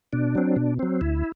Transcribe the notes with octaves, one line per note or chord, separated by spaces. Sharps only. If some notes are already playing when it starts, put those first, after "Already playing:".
B2 D4
F#3 C4
B2
F#3 C4
D2 E4